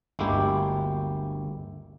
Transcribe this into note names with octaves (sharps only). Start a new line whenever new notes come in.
G1 D2 G#3 A#3 E4 G4